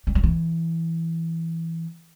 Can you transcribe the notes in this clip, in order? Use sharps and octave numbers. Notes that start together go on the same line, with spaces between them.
G3
F#3
E3